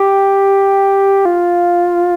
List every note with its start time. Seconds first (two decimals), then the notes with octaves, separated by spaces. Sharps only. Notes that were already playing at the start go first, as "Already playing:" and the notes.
Already playing: G4
1.25 F4